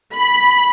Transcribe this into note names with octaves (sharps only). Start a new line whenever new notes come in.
B5